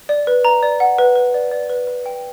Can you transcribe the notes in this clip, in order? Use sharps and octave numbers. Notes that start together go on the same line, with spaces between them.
D5
B4
A#5
D5
F#5
B4
B4
D5
D5
B4
B4
G5